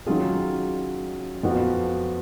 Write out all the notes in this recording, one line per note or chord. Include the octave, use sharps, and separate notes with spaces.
D#3 F#3 C#4 F4 G#4
F2 F3 B3 F#4